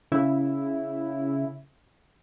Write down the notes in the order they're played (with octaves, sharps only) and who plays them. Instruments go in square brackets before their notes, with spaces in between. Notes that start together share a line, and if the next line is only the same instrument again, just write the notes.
[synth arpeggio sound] C#3 E4